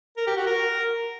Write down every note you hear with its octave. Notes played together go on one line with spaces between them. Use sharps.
A#4
G4
F#4
A#4